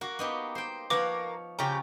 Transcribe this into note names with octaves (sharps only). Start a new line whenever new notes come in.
A#3 F#4
B3 D#4 G4
C5 G5
F3 A#3 B4 C#5 F#5 D6
C#3 F4 G4 A#5